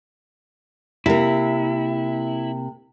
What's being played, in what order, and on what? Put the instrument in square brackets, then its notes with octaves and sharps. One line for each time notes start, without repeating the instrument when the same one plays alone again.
[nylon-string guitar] C3 A#3 [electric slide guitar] E4